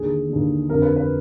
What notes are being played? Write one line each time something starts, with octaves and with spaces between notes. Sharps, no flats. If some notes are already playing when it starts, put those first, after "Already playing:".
Already playing: D#2 D3 G#4
D#2 D3
F2 D3 A#4
B4
B4